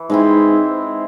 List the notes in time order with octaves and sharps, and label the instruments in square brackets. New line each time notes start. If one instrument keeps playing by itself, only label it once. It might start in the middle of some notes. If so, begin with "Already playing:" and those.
Already playing: [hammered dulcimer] E3
[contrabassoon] G#2 [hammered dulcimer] G#3 C4 E4